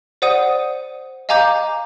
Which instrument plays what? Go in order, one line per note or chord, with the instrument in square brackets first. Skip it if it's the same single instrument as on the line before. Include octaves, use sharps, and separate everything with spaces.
[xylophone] C5 D5 F#5 D#6 D#7
D#5 F5 G#5 A#5 D6 G6